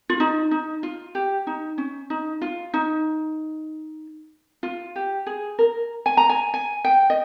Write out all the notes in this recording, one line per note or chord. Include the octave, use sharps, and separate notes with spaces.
F4
D#4
D#4
F4
G4
D#4
C#4
D#4
F4
D#4
F4
G4
G#4
A#4
G#5
A#5
G#5
G#5
G5
D#5